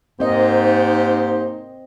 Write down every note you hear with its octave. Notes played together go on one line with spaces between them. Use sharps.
G#2 A#3 C4 D#4 G4 C5 D#5